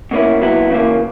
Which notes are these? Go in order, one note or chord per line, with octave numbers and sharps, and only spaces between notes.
B2 A#3 C#4 E4
B1 A#2 F#3 B3 E4
C#3 E3 A#3